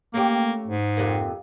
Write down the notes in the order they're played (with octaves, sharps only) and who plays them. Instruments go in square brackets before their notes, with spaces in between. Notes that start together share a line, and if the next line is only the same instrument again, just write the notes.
[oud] A3 C#4 G4 [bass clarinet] A#3
[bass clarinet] G#2
[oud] F2 C3 A#3